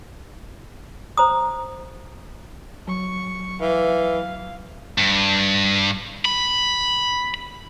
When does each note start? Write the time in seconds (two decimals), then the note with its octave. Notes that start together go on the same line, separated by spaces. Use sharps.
1.17 C5 A#5 D#6
2.88 F#3 C#6
3.61 E3 F5
4.98 G2
6.25 B5